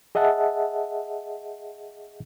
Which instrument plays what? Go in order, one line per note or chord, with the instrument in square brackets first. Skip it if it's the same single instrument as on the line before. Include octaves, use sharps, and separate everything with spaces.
[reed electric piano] G#4 D#5 E5 F#5 A5